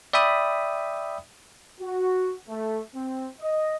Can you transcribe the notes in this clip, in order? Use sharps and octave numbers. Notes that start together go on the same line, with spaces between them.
D5 E5 G5 B5 D#6
F#4
A3
C4
D#5